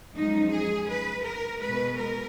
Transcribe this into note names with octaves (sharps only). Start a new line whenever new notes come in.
F#2 F3 G#3 D#4
G#4
B4
A#4
B2 G#3 B4
A#4